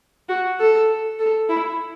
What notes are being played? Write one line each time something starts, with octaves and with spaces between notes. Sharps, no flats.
F#4
A4
A4
E4